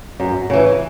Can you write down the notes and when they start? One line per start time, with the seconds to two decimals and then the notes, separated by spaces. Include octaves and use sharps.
0.20 F#2
0.50 C#3 E3